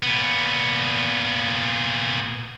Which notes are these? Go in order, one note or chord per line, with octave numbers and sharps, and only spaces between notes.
A#2 B3